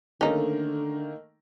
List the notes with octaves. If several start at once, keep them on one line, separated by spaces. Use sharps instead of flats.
D3 D#3 A3 A#3 C#4 D#4